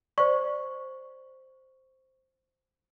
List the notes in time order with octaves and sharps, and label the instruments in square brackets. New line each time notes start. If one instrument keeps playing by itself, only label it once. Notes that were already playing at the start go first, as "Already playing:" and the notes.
[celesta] C5 C#6 [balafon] D5